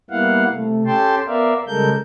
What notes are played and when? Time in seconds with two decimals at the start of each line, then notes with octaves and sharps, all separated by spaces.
0.10 G3 A#3 B3 E4 F5 F#5
0.51 C3 A3
0.86 C#4 G4 A4 G5 A5 C6
1.27 B3 A#4 D5 E5 F5
1.68 C#3 G3 G#3 A4 A#4 G6